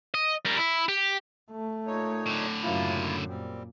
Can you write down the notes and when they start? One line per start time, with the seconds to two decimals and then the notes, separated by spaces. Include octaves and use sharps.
0.14 D#5
0.45 G3 A#4
0.57 E4
0.88 G4
1.51 A3
1.86 A#2 D#4 C#5
2.26 A2 D3
2.63 F#2 C#3 A#3 E4 F4
3.28 A#2 G3 C4